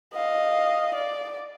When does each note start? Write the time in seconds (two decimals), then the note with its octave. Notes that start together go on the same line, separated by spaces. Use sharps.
0.13 D#5 F5
0.95 D5